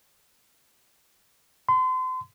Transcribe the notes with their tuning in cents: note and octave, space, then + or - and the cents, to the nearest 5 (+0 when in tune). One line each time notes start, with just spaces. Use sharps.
C6 -35